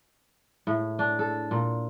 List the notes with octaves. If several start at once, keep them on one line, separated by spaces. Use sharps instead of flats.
A2
D4
A4
A#2